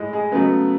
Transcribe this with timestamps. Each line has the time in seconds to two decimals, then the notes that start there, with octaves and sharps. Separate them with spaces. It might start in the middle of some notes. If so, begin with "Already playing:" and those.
Already playing: A2 G#3
0.13 G#3 G#4
0.31 C#3 F#3 A3 B3 B4